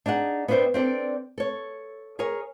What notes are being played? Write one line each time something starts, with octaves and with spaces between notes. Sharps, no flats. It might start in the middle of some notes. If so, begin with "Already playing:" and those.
D4 D#4 G#4 F#5
B3 D4 B4 C5 E5 G5
C4 D4 A4 D5
A4 C#5
G#4 A#4 C#5 G#5